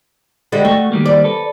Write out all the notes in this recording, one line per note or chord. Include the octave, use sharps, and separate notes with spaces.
D3 G3 G#3
A3 F#4
D#3 G3 A#3
D5
A4 B4